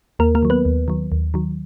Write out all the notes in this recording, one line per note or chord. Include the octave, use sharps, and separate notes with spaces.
D#2 A#3 A#4
A#3 A#4
D#3 F#3
B3 B4
D#2
D#3 F#3
D#2
D#3 F#3